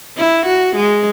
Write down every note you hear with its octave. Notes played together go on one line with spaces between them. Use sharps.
E4
F#4
G#3